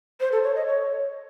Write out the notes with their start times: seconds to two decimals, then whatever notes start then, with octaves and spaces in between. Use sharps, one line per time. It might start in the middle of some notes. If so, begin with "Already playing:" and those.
0.20 C5
0.32 A4
0.43 C#5
0.55 D#5
0.66 C#5